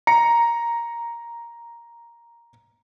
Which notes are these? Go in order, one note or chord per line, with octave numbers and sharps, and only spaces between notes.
A#5 C#7